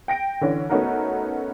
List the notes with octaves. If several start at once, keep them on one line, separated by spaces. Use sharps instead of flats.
G5 A#6 D7
D3 E3 C#4
A3 B3 C#4 D#4 F#4 A#4